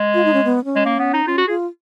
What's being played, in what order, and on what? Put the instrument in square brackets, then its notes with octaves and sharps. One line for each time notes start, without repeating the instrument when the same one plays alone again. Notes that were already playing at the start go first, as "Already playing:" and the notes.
Already playing: [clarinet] G#3
[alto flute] F4
D#4
C#4
B3
C#4
[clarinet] G#3
A#3
B3
D#4
[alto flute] C#4 [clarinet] F4
[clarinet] F#4
[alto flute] F4 [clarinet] G#4